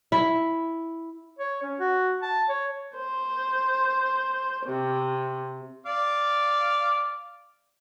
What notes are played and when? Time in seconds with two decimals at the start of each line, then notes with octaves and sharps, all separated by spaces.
0.12 E4
1.39 C#5
1.63 C#4
1.79 F#4
2.22 A5
2.49 C#5
2.96 C5
4.67 C3
5.86 D5 F5 D6